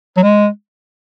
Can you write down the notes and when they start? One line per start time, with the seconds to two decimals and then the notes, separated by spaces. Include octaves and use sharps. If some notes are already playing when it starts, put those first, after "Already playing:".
0.17 F#3
0.23 G#3